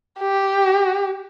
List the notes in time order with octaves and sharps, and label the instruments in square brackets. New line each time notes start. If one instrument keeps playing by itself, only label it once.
[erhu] G4